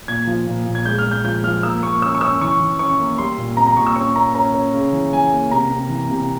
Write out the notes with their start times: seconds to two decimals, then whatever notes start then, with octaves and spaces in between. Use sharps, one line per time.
0.08 A#2 G#6
0.27 F3
0.47 A#2
0.66 A#2
0.75 G#6
0.85 G#3 G6
0.98 F6
1.05 G#3
1.11 G6
1.24 F3 G6
1.44 F3 F6
1.63 A#3 E6
1.83 A#3 C#6
2.02 C#4 E6
2.15 C#6
2.21 C#4 E6
2.41 E3 C#6
2.61 E3
2.79 C#4 C#6
2.99 A#3
3.18 G3 C6
3.38 A#2
3.57 C4 A#5
3.67 A#5
3.77 A#2 C#6
3.86 E6
3.96 C#4 C#6
4.15 A#3 A#5
4.35 C#4 A#5
4.54 C#4
4.73 C#3
4.93 E3
5.13 E3 G#5
5.32 A#3
5.51 C3 A#5
5.71 C3
5.90 E3
6.09 C3